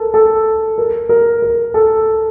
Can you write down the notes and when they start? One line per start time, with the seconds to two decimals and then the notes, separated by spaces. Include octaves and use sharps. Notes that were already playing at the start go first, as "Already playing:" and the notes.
Already playing: A4 A#4
0.14 A4
0.78 A#4
1.09 A#4
1.42 A#4
1.74 A4